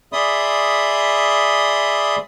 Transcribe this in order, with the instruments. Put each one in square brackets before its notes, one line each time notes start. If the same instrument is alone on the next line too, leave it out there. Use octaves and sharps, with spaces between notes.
[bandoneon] G#4 D5 E5 B5 C6 D#6